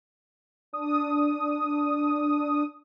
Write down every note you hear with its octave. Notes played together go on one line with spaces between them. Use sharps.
D4 D#6